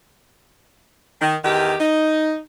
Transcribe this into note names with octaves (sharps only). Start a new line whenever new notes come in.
D#3
E2 D#3 G4
D#4